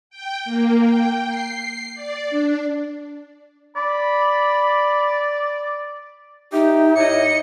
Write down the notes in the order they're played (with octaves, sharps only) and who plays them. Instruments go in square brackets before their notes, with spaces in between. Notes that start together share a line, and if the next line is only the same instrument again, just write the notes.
[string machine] G5
A#3
G5
C7
D5
D4
[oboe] D5 [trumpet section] B5
[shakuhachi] D#4 [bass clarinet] G4 [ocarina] E5
[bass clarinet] A2 [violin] D#5 C#7